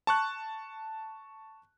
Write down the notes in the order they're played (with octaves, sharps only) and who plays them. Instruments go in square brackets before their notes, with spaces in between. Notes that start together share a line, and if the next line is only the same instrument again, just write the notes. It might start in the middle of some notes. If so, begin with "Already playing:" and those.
[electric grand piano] A5 C#6 F#6